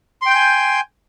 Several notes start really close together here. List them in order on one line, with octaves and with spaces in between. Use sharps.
C6 G5 G6 G#5